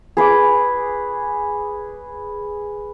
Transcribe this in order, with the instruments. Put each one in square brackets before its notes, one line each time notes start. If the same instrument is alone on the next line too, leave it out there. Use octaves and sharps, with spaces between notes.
[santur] G#4 B4 C#5 D6